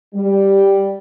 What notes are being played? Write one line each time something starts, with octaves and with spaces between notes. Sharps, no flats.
G3